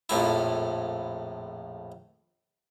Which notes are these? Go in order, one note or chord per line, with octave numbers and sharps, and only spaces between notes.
A#1 F2 A2 E4